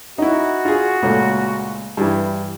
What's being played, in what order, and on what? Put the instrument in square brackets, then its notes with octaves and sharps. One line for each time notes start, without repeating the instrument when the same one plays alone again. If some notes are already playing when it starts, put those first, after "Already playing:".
[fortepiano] D#4 E4 [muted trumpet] F#4
[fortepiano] F4 G#4
C#2 A#2 A3
G2 E3